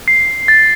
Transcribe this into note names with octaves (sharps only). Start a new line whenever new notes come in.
C7
A6